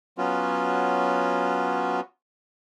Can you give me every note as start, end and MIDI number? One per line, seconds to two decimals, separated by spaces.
0.18 2.00 54
0.18 2.00 59
0.18 2.00 61
0.18 2.00 65
0.18 2.00 66